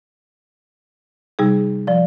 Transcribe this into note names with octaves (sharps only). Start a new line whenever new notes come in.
C3 G3 D#4 G#4
F3 D5